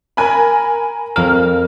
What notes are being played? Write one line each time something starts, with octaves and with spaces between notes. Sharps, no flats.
A#4 G#5 B5
F2 A#4 F6